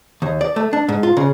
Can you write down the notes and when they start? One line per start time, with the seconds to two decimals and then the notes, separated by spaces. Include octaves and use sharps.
0.22 D#2
0.41 D5
0.56 A3
0.73 D4
0.88 G#2
1.03 F4
1.17 C#3